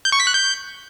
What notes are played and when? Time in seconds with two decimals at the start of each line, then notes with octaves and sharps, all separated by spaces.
0.05 G6
0.12 C#6
0.20 B6
0.27 F#6
0.34 G6